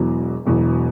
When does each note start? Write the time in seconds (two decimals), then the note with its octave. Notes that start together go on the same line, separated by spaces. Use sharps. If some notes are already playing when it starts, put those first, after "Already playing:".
Already playing: E1 E2 B2 F#3
0.45 E1 E2 B2 F#3